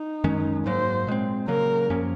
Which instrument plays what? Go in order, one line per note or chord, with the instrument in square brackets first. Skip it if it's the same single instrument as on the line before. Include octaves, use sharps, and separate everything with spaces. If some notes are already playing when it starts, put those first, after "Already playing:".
Already playing: [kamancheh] D#4
[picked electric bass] F#2 D#3 G#3 C#4
[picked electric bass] G#2 F#3 A#3 [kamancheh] C5
[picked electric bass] A#2 G#3 C4
[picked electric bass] C#3 F#3 A#3 [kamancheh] A#4
[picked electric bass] F#2 F3 A#3 C#4